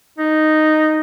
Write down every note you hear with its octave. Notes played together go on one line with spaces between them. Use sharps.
D#4